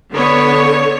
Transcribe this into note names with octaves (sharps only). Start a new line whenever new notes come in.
D3 B3 C#5